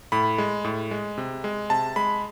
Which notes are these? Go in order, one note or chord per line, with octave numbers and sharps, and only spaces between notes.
A2 B5
G#3
A2
G#3
C3
G#3
C3 A5
G#3 B5